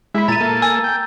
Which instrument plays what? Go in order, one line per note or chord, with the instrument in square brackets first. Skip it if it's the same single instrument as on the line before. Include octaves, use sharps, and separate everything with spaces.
[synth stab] G#3 B5 [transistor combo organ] E4
[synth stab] A#2 D#7 [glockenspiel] A#5 A6
[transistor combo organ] A#3 A4
[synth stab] G#5 [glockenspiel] E6
[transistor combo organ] G5